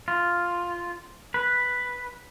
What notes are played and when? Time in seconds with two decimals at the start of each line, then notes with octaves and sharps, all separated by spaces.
0.08 F4
1.34 B4